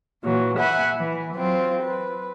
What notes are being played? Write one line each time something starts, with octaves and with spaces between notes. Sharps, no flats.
A#2 E3 F#3
E5 F#5 G#5 B5 F#6
E3
F#3 C4 F4
B4